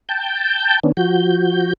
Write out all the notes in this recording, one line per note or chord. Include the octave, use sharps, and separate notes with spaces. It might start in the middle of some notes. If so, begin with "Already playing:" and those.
G5 A5 G6
D#3 B3 C#4 D4
F3 F#4 G6